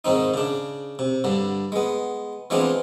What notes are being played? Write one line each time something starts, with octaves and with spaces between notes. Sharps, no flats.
G#2 D#3 C4 D#4
C#3 D4
C3
G2 D3
G#3 B3
E3 G#3 B3 C4 D4 F4